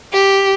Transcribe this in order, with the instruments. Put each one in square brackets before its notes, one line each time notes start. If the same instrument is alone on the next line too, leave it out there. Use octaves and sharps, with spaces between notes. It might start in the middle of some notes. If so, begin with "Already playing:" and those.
[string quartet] G4